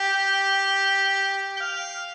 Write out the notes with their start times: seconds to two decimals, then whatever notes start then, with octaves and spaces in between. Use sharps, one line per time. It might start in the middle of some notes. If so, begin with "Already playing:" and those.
Already playing: G4
1.57 G5
1.60 F5